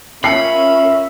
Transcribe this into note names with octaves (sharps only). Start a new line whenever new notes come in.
C#4 F4 A#4 E5 B5 C7 C#7